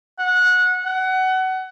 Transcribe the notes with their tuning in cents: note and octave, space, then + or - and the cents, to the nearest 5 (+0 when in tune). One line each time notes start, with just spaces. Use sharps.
F#5 -20
F#5 +25